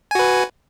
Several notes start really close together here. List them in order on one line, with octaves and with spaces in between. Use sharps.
G#5 F#4 B4